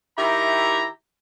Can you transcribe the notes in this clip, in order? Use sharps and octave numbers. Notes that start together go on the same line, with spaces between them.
D#3 E4 G4 E5 A#5